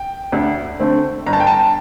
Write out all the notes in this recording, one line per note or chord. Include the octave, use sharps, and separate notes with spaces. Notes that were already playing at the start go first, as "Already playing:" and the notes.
Already playing: G5
D2
D3 A3 C4
G1 A#5
A5
G5
A5